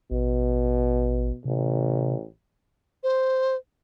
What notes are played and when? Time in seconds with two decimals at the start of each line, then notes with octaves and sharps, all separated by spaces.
0.11 A1 B2
1.45 A1 C3
3.03 C5